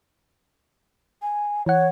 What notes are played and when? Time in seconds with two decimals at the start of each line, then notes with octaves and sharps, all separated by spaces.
1.22 G#5
1.66 E3 C#5 F#5